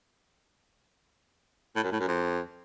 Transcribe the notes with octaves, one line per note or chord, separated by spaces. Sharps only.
A2
F#2
A2
F#2
F2